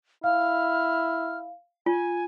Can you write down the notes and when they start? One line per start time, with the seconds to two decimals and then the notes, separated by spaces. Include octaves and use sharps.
0.24 E4 F5 F6
1.86 F4 G#5